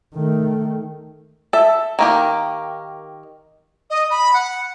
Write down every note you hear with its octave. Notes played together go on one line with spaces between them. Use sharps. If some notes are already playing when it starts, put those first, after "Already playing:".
D#3 A3
A4 E5
D#3 A#3 G4
D#5
B5
F#5